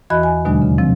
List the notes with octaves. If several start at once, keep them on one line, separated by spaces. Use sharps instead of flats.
E2 E3 F#4 D#5 B5 F#6
G#5
D#2 B2 D3 F#3 G#3 D4
C#3
C3 F3 C4